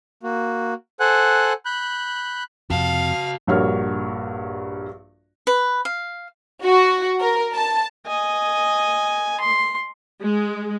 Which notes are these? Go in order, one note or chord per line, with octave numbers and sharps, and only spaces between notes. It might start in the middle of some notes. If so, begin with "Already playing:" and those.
A#3 F#4
A4 C5 F#5 G#5 F#6
B5 F#6 G6
F2 C3 F#4 F5 A5
A#1 G2 F#4 A#4 C#5 F6
B4
F5
F#4
A#4
A5
D#5 G#5
C6
G#3